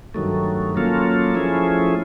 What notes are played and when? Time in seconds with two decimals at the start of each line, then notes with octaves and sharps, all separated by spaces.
0.14 G2 D#3 F#3 A3
0.75 F#3 A#3 C#4 F4 A4
1.34 F3 A3 C#4 E4 G#4